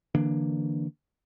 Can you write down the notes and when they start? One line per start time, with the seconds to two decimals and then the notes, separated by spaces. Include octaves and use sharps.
0.15 D3 E3 A#3 D4